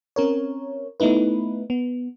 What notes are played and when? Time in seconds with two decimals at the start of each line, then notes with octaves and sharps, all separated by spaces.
0.16 C4 C#4 A#4 C#5
1.00 A3 B3 D#4 E4 B4
1.70 B3